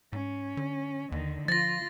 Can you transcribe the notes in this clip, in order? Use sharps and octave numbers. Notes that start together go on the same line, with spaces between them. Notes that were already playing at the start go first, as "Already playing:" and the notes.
G#2 C#4
D3
D#2 D3 D#3
F3 F4 A6 A#6